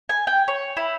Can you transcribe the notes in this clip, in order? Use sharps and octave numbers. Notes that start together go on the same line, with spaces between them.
G#5
G5
C#5
E4